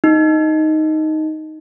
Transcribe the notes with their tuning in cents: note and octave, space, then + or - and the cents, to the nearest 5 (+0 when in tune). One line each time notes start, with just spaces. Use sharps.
D#4 +5